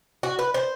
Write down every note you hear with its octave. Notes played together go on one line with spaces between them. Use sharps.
F#4
B4
C5